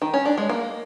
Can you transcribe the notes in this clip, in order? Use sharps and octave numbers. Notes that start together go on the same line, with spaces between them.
D#3
C#4
D4
G#3
A#3